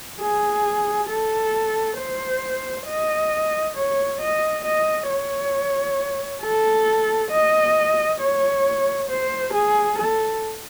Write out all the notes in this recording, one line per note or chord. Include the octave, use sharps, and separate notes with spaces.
G#4
A4
C5
D#5
C#5
D#5
D#5
C#5
A4
D#5
C#5
C5
G#4
A4